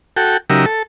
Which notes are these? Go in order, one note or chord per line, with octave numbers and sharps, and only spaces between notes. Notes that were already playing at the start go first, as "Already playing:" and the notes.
F#4 A4 G5
C#3 F#3 D#4 G4 A#4 E5
A4